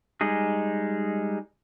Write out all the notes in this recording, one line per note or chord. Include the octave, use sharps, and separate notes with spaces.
G3 G#3 D#4 G#4